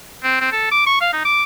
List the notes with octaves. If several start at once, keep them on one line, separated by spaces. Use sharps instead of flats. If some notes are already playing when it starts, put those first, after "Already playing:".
C4
C4
A4
D6
C#6
F5
D#4
D6